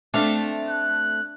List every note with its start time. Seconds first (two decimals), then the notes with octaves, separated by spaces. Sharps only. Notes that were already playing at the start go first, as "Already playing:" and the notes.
0.14 A3 C4 D4 F5
0.69 F#6